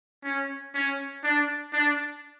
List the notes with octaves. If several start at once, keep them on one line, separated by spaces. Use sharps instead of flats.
C#4
C#4
D4
D4